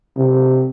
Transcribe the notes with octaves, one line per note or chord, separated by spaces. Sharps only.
C3